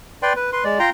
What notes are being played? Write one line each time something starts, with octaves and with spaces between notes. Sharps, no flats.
B4 D5 G5 C6
B4
B4 C6
G#3 D5
F4 G5 A#5 C6